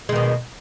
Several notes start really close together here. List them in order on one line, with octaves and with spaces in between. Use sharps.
G#3 D#3 B2